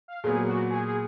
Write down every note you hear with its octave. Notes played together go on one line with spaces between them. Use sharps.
F5
A#2 F#3 B3 G#4
F#4
G#4
G#4